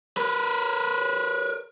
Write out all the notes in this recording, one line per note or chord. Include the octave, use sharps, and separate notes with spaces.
A#4 B4